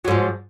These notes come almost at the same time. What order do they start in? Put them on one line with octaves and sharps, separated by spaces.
F#3 G#2 F3